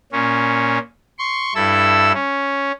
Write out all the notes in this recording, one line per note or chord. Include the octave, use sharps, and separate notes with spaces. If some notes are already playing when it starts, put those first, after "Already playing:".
A#2 C#4
C6 C#6
G2 E4 A4 E6
C#4